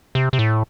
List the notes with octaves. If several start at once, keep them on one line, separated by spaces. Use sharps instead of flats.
C3
C3
A2